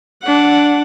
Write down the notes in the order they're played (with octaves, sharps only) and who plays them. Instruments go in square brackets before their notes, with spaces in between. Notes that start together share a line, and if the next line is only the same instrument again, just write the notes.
[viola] D4 F#5